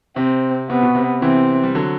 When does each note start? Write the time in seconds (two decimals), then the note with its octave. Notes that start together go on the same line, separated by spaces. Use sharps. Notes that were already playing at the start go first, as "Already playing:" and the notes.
0.16 C3 C4
0.70 C3 B3
0.83 B2
0.95 C3
1.22 C3 E3 C4
1.63 G3
1.75 D3 F#3